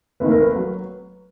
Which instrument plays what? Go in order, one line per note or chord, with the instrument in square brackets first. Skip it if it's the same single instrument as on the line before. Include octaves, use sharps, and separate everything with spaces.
[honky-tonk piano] F1 D#2 D#3 [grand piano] B4
[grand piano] A#4
B4
[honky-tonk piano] F#3